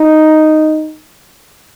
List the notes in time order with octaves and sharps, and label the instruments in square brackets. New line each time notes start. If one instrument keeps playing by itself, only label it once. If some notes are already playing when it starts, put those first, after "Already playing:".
Already playing: [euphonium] D#4